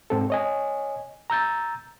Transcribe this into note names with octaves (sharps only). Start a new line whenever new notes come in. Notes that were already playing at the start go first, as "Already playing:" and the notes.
G#2 C4 A4
C#5 D#5 G#5
A#5 E6 G6 A6